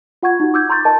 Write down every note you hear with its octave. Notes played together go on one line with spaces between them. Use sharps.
F4 F#5 C#6 G#6
D#4 F#4
D6 E6 G6 G#6
A#5 C6 C#6 G6 A6
A#4 D#5 A5